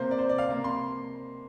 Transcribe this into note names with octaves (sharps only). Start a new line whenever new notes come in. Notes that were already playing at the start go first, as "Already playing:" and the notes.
Already playing: C3 A#3 C5
D5
C5
D5
F5
C3 A#3
C6